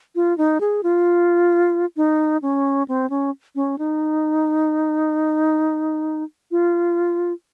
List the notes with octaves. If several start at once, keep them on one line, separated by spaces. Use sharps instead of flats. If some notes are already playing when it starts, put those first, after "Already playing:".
F4
D#4
G#4
F4
D#4
C#4
C4
C#4
C#4
D#4
F4